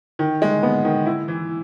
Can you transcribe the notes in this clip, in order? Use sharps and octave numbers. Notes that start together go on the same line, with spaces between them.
D#3
G#3
B3
D#3
E4
E3